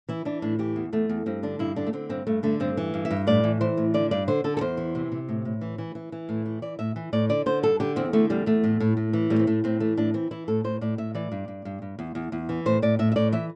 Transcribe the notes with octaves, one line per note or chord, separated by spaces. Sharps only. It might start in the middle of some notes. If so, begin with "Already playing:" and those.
E3 E4
E3 D4
A2 D4
E3 G4
E2
E2 A3
E2
G2 C4
D3 D4
G2 E4
D3 D4
A3
D3 C4
G2 C4
G2 A3
D3 A3
G2 C4
E3
G2
E5
G2
A2 D5
E3
E3 C5
A2
D3 D5
G2 D5
D3 C5
D3 A4
A4
E2 C5
E3
C3
C3
A2
A2
E3
E3
E3
E3
A2
E3
E3 D5
A2 E5
E3
A2 D5
D3 D5
D3 C5
G2 A4
D3 G4
E2 C4
D3 A3
E2 G3
E2 A3
A2
A2
A2
E3
A2 G3
C4
A2 A3
A2 C4
E3 A3
A2 D4
E3 C4
E3 E4
A2 A4
A2 C5
A2 D5
A2 E5
E3 D5
G2
G2
G2
G2
E2
E2
E2
E3
A2 C5
A2 D5
A2 E5
E5
A2 D5
E3 E5